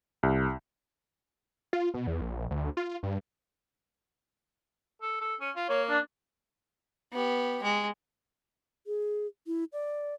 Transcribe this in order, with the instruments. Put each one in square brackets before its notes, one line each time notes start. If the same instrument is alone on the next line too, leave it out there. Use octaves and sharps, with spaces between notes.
[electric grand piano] C2
[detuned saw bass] F4
B2
E2
A#1
D2
F4
G2
[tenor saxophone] A4
A4
C#4
F4
[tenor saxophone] A#3 [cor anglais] C#5
[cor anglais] D4
[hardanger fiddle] B3 G4
G#3
[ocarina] G#4
E4
D5